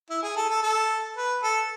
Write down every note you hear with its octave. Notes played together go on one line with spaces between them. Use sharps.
E4
G#4
A4
A4
A4
B4
A4